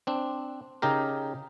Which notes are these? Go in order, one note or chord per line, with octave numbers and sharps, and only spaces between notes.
C4 D4
C#3 D#4 G4 A#4